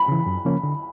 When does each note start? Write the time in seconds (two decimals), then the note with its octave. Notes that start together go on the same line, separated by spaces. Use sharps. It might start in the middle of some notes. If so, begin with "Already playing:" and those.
Already playing: B5
0.08 C#3 E3
0.26 F#2
0.45 C#3 F3 A#3 C#4
0.63 D3